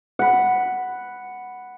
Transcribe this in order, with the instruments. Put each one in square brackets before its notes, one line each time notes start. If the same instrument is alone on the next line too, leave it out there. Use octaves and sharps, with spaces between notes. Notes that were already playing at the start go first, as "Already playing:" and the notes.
[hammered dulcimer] F#5 B5